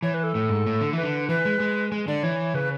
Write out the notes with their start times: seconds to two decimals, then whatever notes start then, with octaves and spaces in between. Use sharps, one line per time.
0.02 E3 C#5
0.14 B4
0.24 A4
0.35 A2
0.50 G#2
0.66 A2
0.81 D3
0.93 E3 B4
1.03 D3
1.29 E3 B4
1.45 G#3
1.60 G#3
1.92 G#3
2.08 D3 D5
2.23 E3 C#5
2.54 C#3 B4